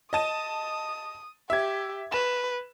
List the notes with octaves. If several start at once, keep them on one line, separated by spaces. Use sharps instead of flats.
D#5 A5 D#6 D#7
G4 E5 G#6
B4 E7